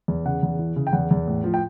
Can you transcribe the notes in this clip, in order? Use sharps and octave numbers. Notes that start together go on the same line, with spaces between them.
E2
C#3 F#5
E2
E3
C#3
G5
E2 F#5
E2
A2
F3
G5